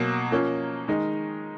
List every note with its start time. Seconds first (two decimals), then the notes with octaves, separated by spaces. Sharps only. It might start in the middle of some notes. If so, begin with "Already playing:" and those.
Already playing: B2 F#3 A#3
0.31 F3 A#3 C#4
0.88 D#3 G#3 D#4